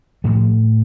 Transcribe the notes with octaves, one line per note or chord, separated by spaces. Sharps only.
A2 F3